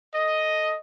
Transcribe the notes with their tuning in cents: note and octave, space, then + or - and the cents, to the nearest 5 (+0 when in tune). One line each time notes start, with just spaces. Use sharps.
A4 +0 D#5 +5